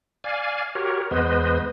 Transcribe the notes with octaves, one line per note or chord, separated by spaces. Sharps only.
D5 F5 G#5
F#4 G4 A#4 C#5
E2 G#3 B3 B4 C5 D#5